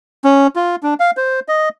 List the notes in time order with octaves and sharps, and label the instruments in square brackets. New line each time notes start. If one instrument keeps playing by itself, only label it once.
[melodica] C#4
F4
D4
F5
C5
D#5